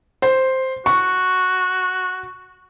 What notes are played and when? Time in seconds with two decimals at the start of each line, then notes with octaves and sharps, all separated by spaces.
0.22 C5
0.86 F#4 C#6